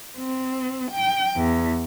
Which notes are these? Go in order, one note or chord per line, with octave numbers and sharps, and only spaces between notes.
C4
G5
E2